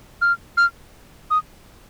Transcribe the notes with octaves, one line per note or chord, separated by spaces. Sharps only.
F6
F6
D#6